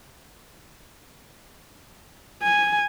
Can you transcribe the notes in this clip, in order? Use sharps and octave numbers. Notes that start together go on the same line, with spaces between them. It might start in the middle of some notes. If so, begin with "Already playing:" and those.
G#5